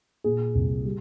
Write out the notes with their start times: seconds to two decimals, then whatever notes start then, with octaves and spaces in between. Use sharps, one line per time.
0.24 A#2 G#4
0.55 C2
0.85 G3